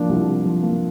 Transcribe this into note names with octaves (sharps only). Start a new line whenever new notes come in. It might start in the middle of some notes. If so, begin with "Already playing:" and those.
Already playing: F3 A#3 D4
C2
C3
F3
A#3